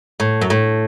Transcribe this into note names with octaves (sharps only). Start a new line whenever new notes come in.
A2
F#2
A2